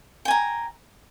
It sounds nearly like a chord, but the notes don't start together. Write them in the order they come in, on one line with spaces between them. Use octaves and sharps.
G5 G#5 A#5